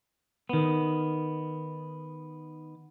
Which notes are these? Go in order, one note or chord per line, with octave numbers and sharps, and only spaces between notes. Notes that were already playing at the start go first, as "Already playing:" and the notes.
D#3 B3